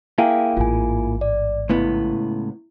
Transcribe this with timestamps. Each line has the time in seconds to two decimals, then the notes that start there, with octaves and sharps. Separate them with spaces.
0.18 A#3 E4 G#4 E5 F5 G5
0.57 A1 G#2 F4 G#5
1.21 D5
1.69 C#2 A2 B3 E4